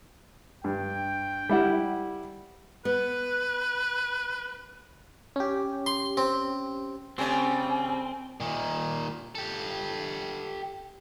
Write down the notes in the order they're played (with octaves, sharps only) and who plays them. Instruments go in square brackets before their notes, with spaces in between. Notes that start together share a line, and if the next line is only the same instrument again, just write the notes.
[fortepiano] G2 [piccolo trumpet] G5
[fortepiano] G3 E4 F#5
[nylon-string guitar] B3 [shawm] B4
[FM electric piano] C#4 G4
[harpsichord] C6
C4
[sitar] C#3 G3 A3 [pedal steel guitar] C4 [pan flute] G#5
[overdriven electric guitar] A#2 D#3
G4 A4